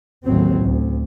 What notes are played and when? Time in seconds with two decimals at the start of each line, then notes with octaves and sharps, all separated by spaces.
0.25 A1 D#2 A2 F#3 C4
0.64 D2